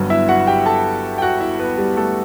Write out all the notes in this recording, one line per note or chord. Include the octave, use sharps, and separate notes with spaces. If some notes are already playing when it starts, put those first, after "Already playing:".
Already playing: G1 G2 F#3 B3
E4 E5
F#4 F#5
G4 G5
A4 A5
G5
F#4 F#5
E4 E5
B3 B4
G3 G4
A3 A4